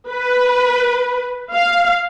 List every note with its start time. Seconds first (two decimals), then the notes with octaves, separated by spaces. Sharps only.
0.11 B4
1.54 F5